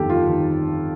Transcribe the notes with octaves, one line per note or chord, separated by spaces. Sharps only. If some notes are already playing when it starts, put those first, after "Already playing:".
Already playing: G1 F2 D#3 G4 A4
F4
D#3